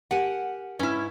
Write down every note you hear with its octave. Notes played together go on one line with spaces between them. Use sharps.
G4 A#4 F#5 G#5
G#2 C#4 E4 B4